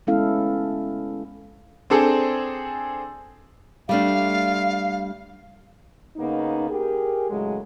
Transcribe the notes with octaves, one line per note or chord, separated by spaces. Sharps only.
G#3 B3 C#4 E4 A4 F5
C4 D4 G#4 A4 C5
G3 A3 D4 F5
C#3 A#3 B3 D#4
G4 G#4 A#4
A2 C#3 F#3 G#3